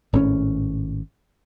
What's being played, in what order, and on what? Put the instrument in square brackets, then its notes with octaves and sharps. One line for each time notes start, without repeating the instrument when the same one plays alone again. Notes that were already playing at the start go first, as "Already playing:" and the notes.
[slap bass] G#1 A2 C4 C#4